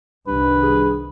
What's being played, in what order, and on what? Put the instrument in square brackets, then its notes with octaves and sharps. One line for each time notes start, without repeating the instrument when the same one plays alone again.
[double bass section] C2 D#3 [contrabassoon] G2 [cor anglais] B4
[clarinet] G#4